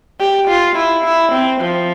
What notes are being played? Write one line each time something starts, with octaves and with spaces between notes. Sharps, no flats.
G4
F4
E4
E4
C4
F3